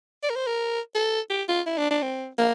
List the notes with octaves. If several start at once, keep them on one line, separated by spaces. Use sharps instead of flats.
D5
A#4
C5
A#4
A4
G4
F4
E4
D4
D4
C4
A#3